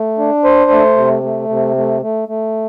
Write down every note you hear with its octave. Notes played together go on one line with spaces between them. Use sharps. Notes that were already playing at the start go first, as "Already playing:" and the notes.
Already playing: A3
D4
C5
A3
C3
A3
C3
A3
A3
A3